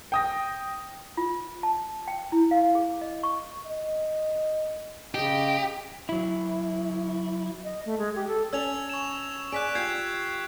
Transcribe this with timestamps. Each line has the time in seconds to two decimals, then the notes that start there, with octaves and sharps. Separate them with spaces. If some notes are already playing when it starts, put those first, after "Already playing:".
0.12 G5 D#6 A#6
1.17 F4
1.63 A5
2.08 G5
2.32 E4
2.51 F5
2.75 G#4
3.01 D#5
3.23 C#6
3.66 D#5
5.14 C#3 G4 D#5
6.09 F#3 E4
7.64 D#5
7.85 A3
7.98 G#3
8.15 G4
8.27 A4
8.53 C#4 G#5 A5 E6 G#6 F7
8.89 C#6 E7
9.52 G#4 D5 F#5 F#6 B6 D7
9.75 F4 G4 G6 G#6 C7